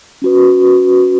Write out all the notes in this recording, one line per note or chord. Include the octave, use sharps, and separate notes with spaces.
C#4 F#4 B4